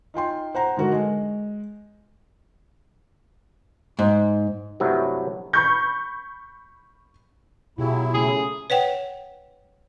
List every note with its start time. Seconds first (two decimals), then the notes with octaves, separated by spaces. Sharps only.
0.14 D#4 F4 G5 C6
0.55 C5 F#5 A#5
0.77 G#2 D3 F#4 A#4
0.92 G#3
3.99 G#2
4.80 G2 C3 F#3 A3 E4
5.53 B5 C#6 G6
7.78 B2 F#3 E4 F4 G4 G#4
8.14 C#3 A3 G#4
8.70 B4 C#5 F#5 G5